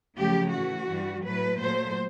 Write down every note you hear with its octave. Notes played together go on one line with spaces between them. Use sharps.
F#2 C#3 F3 A3 G4
A2 E3 A3 F#4
G2 E3 G3
A2 F#3 A3 B4
A#2 F#3 A3 C5